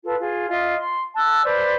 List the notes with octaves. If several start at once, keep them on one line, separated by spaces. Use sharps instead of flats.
F4 A4 B4
F4 G#4
F4 D#5 E5
C6
A5 E6 F#6
B4 C5 D5